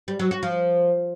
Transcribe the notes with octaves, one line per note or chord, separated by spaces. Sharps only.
G3
F#3
F#4
F3